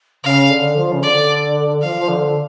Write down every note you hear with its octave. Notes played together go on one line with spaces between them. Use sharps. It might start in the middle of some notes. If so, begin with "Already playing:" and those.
C#3 F5
D3
F3
C#3
D3 D5
F3 F5
F3
D3